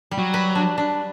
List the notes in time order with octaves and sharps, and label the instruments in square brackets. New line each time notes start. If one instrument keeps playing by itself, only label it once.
[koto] G3
[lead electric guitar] F#3
[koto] B4
D4
D4